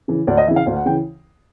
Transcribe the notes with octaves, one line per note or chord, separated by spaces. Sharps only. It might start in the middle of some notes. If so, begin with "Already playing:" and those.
C#3 E3
D2 D5
D#5
C#3 E3 E5
F5
D2 F5
F#5
C#3 E3 G5